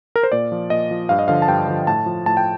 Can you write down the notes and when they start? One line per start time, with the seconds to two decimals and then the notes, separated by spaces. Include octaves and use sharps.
0.16 A#4
0.23 C5
0.32 A#2 D5
0.52 F3
0.70 A#2 D#5
0.91 F3
1.09 G2 F5
1.19 D#5
1.28 D3 F3 F5
1.42 A5
1.48 G2 G5
1.67 D3 F3
1.87 A2 A5
2.06 F3
2.26 A2 A5
2.37 G5